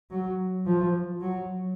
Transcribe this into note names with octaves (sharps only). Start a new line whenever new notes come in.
F#3
F3
F#3